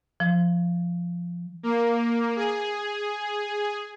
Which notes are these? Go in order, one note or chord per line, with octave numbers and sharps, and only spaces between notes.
F3
A#3
G#4